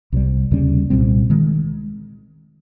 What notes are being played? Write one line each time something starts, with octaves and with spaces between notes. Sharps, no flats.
C2 C3 G3
D#2 C#3 G3 C#4
C2 A#2 G3 C4
D#3 G#3